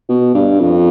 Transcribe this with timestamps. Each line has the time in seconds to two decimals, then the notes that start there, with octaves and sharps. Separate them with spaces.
0.09 B2
0.35 G2
0.60 F2